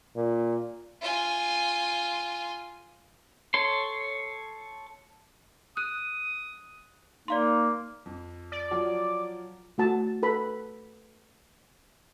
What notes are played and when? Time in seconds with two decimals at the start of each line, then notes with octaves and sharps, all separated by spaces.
0.15 A#2
1.01 F4 G#5
3.54 A4 C#5 C6
5.77 D#6 F#6
7.28 A#3 D#4 D5 F5 C6
8.06 F2
8.52 D5
8.71 F3 F#3
9.78 A3 F#4 A5
10.23 A4 B4 B5